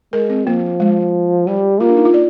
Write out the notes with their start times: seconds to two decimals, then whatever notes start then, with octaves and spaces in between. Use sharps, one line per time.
0.13 G#3 A#4
0.30 C4
0.46 F3 A#3
0.80 G#3
1.47 G3 G4
1.80 A#3 F4
1.88 D4
1.97 D#4
2.05 F4
2.14 D5